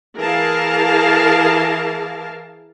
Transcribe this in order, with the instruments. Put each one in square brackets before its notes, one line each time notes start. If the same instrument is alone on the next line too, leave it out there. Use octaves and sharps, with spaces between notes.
[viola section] E3 G#4 A#4 F5 A5